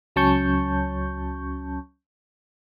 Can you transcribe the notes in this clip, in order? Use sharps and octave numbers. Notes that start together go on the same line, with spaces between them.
C#2 F#3 C#4 A5 C#6 G6